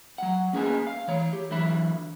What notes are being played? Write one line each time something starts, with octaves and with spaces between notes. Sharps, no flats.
F#3 F#5
A#3 C#4 G#4 B4 D#5 G#5
F5
E3 C#5
G4
D3 E3 F#3 E5 B5